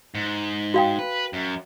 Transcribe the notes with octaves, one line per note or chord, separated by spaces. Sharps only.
G#2
F#4 F5 G5
B4
F#2